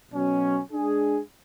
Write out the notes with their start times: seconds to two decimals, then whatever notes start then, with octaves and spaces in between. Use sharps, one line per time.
0.11 B2 F#3 C#4
0.72 G#3 D4 G#4